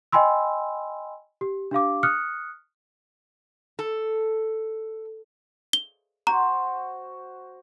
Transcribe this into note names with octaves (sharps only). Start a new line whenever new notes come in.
D#5 G5 G#5 B5 C6 E6
G4
D4 G4 F5 D6
D#6 F6 F#6 C#7
A4
G7
F#4 C5 A#5